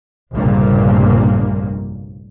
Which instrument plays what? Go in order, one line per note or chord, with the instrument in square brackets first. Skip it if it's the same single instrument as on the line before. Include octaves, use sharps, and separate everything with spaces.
[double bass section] F1 A#1 G2 A#2 C#3 A#3